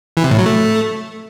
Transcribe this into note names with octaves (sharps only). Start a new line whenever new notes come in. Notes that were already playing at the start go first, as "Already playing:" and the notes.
E3
C3
A2
F#3
A3